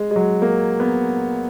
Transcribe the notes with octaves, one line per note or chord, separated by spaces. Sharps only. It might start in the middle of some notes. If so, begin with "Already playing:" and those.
Already playing: G#3
G#3
F#3
A#3
B3